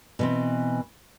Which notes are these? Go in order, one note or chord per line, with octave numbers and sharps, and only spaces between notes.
B2 E3 C4